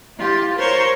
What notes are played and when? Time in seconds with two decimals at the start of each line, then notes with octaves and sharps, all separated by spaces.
0.16 E4 F4 G4
0.56 A#4 C5 C#5 C6 C#6